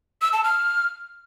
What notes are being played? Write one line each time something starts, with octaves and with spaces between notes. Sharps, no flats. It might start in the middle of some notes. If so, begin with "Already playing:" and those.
E6
A5
F6